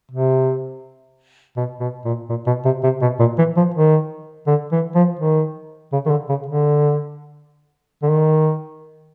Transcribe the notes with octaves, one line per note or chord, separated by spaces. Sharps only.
C3
B2
B2
A#2
A#2
B2
C3
C3
B2
A#2
E3
F3
D#3
D3
E3
F3
D#3
C#3
D#3
D3
C#3
D3
D3
D#3